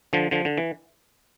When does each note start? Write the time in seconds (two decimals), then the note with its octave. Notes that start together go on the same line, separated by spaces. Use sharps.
0.13 D3 F3
0.31 D3 F3
0.45 D3
0.58 E3